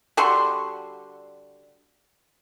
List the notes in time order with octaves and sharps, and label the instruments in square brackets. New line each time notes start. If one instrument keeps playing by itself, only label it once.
[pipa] D3 G3 F#4 C6